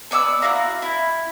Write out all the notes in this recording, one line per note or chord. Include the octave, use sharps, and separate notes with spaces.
B3 D5 C#6 E6
E4 F#4 F5 A#5
E4